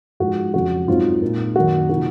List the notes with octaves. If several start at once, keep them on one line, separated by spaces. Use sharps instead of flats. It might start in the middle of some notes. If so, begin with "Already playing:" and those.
G#2 F3 G#3 F#4
F2 C#3 F#3 F#4
G#2 F#3 C4 D#4 F4
A#2 G#3 D#4
F#2 D#3 A#3 F#4
C3 F3 A#3 D#4 F#4